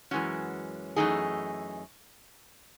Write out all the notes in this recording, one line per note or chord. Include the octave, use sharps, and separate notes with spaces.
F#2 E3 G#3 C#4 F#4
F#2 E3 A3 D#4 G#4